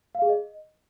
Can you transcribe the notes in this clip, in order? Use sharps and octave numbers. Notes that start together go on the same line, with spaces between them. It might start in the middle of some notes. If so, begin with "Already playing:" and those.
F5
G#4
D#5